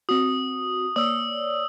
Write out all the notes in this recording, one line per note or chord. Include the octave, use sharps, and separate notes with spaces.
C4 F#4 D#6
A#3 C#5 D5 D#6 E6